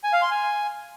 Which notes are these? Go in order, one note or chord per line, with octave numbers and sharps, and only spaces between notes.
G#5
F5
C6
G#5